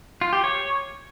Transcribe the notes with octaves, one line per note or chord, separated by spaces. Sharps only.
F4
G4
C#5